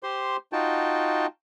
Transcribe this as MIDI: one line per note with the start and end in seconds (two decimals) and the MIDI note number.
0.03 0.37 67
0.03 0.37 72
0.03 0.37 84
0.53 1.26 63
0.53 1.26 65
0.53 1.26 66
0.53 1.26 79
0.53 1.26 81